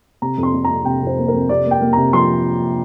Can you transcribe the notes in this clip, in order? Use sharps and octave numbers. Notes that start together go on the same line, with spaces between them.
C3 A#5
F2
C6
C3
A#5
C3
C3 G5
F2 C5
A#3
A#4
F2
C3 D5
A#3
G5
A#3
C3 A#5
F3 C6